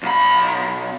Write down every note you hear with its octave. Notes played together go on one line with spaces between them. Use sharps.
B1 B5